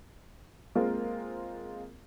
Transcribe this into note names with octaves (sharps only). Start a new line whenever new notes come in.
G#3 A#3 C4 F4 A#4